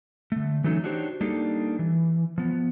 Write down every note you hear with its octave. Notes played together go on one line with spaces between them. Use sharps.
D3 A3
E3 F#3 A3 C#4 D#4
D4 D#4 F#4 G4 C5 C#5
G3 A#3 D4 D#4 G4 A4
E3
F3 B3